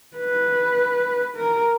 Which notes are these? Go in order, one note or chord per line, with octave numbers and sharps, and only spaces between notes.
B4
A#4